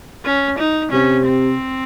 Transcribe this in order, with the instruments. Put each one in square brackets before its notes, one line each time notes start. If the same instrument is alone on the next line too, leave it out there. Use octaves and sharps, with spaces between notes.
[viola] C#4
D#4
[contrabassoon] C3 [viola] C#4
[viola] C4